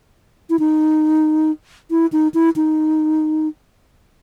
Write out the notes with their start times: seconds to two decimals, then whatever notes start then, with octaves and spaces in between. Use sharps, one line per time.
0.50 E4
0.59 D#4
1.91 E4
2.13 D#4
2.34 E4
2.56 D#4